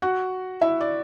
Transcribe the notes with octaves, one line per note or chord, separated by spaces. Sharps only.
F#4 F#5
E4 E5
D5